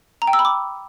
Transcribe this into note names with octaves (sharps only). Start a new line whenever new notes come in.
A#5
G5
E6
B5
D6